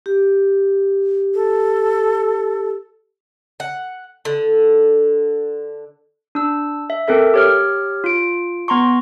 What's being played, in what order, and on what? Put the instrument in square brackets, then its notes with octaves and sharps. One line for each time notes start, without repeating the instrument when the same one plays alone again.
[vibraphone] G4
[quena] A4
[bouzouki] F#5
D3
[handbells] D4 E6
E5
C4 A4 A#4 E5
G4 C#5 F6
F4 D7
B3 A#5 C6 C#6